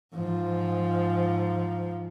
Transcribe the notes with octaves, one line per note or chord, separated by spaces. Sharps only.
G#2 F3